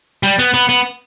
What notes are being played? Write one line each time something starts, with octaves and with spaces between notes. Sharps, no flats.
G3
B3
B3
B3